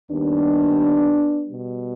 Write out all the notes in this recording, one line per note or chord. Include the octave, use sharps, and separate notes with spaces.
D#2 D#3 G3 B3 D4
B2 G3